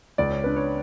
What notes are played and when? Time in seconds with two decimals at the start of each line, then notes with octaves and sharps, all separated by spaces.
0.18 C#2 D5
0.30 C#5
0.44 D4 B4
0.56 C#5